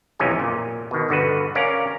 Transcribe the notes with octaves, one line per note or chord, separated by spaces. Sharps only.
B1 F2 C3 E3 C#4 G#5
A#2
B2 D#3
G1 D3 F#4 B4
C#4 A#4 D5 F5 A#5